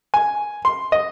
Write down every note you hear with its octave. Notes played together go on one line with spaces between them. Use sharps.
G#5
C6
D#5